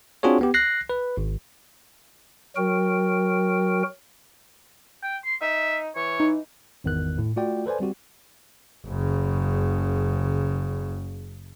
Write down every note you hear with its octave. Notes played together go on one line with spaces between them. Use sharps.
C4 D4 F4 F#4 G#4 C#5
B3 G4
F#6 A#6 C7
B4
G#1
F#3 F#4 A#4 G5
G5
C6
D#4 E5
E3 C#5
D#4
G#1 E2 D#3 B3 F#6
A2
A3 F4 F#4 D5 G5
A4 B4 C5 D5 G#5
G3 C4 F#4 G4
F#1 C#3